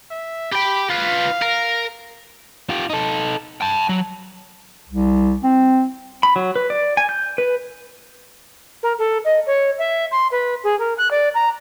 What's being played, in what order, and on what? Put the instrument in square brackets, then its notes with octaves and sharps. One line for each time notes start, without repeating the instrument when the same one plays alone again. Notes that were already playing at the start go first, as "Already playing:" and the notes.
[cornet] E5
[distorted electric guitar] G4 G5 [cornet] B5
[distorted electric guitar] F4 B4 [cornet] F5
[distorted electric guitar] A#4
[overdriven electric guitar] F4 G4
D#4 A4
G5 A5
F#3
[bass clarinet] C2
C4
[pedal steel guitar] B5
F#3
B4
D5
G#5
G6
B4
[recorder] A#4
A4
D#5
C#5
E5
C6
B4
G#4
A#4
F#6
D5
A#5